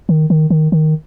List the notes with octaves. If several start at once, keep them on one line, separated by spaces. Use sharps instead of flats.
D#3
D#3
D#3
D#3